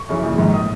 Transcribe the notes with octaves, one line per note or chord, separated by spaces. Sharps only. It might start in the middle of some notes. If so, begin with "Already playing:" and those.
Already playing: C#6
F#2 C#3 E3
A#1
G#2 D#3
D#6